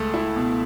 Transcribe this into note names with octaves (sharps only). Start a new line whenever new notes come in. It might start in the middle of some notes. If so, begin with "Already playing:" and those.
Already playing: C#2 A3
E4
B2